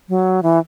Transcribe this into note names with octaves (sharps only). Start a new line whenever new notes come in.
F#3
E3